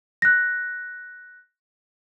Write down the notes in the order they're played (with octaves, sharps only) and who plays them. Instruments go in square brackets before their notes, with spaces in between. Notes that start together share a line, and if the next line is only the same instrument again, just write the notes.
[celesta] F#6 A#6